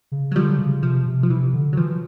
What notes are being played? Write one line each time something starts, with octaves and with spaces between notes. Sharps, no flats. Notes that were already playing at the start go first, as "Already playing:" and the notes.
C#3
F#3
D3 F3 G3
C#3
C3 F3
C3
F3
C3 E3
D3
F#3
E3 F3